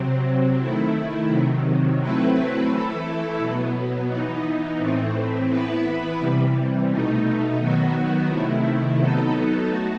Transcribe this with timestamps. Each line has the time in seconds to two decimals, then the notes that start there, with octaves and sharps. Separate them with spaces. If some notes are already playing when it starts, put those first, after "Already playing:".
Already playing: C3 F#3 C4
0.58 D#3 A3 E4
1.28 C3 D#3 F#3
1.98 F#3 A3 C4 E4 B4
2.68 E3 A3 E4 A4
3.38 B2 F#3 B3
4.08 E3 B3 D#4
4.78 A2 E3 A3 C4
5.49 E3 B3 E4 B4
6.18 C3 E3 G3
6.88 B2 A3 D#4
7.58 D#3 F#3 B3 F#4
8.28 C3 D#3 A3 E4
8.97 F#3 B3 D#4 A4
9.68 A3 F#4